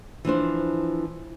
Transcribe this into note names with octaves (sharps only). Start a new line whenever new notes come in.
E3 F3 D4 C5